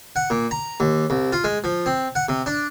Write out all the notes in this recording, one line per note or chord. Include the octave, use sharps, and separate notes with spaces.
F#5
A#2
A#5
D#2
C2
F4
G#3
F3
C4
F#5
C3
D4